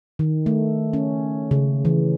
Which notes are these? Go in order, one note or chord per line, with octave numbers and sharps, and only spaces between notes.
D#3
A3
C#4
C#3
E3